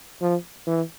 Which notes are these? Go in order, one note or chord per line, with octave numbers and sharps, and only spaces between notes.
F3
E3